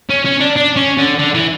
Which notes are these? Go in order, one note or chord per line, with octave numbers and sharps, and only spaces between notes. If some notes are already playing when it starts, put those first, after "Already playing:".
C#4
C#4
D4
D4
C#4
D3
D3
E3